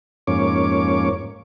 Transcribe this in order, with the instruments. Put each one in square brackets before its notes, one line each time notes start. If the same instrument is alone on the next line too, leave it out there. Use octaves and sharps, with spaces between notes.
[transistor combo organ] F2 G#2 A#3 C#4 C#5 D6